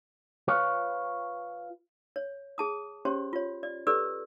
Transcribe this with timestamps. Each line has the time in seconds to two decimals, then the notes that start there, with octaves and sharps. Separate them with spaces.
0.48 F4 B4 C#5
2.16 C#5
2.58 G#4 A5 D#6
3.05 C#4 G4 C5 C#5 C6
3.33 F4 C#5
3.63 D5
3.87 G4 A4 B4 D5 E6